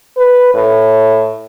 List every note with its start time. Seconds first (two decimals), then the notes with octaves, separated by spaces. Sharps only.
0.17 B4
0.54 A2